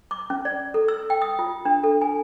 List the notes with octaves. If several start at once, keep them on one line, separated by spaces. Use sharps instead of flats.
D6
C#4
D5
A4
E6
G5
D#6
F4
D4
A4
G#5